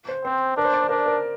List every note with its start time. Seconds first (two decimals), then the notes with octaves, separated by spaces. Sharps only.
0.08 C5
0.25 C4 C5
0.57 D4 A#4
0.65 C5
0.73 D5
0.82 C5
0.89 D4 A#4
1.06 A#4